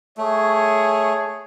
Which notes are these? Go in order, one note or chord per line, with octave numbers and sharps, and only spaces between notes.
A3 G#4 C#5